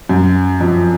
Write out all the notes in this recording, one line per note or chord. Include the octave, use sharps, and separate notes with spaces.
F#2
F2